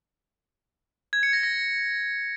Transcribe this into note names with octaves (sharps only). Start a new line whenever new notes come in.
G#6
C#7
A#6
A#6